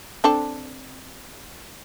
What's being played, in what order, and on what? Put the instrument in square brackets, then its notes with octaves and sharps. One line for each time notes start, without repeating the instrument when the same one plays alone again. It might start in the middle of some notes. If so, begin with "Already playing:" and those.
[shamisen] C4 D4 A4